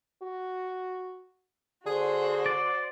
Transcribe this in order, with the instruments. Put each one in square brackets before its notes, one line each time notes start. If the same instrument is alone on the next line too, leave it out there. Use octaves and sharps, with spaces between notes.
[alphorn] F#4
[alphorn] D3 [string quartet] F#4 C5 [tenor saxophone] G#4
[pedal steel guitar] D5